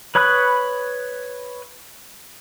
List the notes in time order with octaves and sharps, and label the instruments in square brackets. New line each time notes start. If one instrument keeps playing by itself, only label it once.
[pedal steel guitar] B4 C#5 B5 D#6 F#6